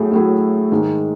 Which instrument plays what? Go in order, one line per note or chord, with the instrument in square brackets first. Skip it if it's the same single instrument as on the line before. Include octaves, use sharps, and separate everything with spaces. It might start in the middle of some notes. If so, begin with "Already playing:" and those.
Already playing: [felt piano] A2 F#3 A3 E4 G#4
A2 F#3 A3 E4 G#4
G#2 D#3 G#3